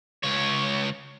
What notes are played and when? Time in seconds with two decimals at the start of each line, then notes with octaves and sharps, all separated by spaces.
0.24 C#2 C#5